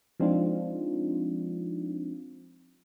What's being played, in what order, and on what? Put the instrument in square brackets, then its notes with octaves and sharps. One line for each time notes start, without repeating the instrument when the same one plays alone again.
[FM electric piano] F3 G#3 C4 D4 D#4 F4